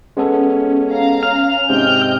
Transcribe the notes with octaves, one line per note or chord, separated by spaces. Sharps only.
G#3 B3 C#4 A4
F5 A#5
F6
G#2 C3 D#5 G5 G6